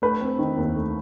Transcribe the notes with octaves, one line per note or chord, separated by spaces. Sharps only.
A3 B4
C4
D#3
D#2
A3